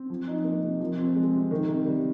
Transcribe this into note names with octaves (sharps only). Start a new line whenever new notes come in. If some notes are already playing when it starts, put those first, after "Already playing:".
Already playing: C4
F3
D#4
A#3
C3
F3
C4
G#3
C3
D#3
C3
G3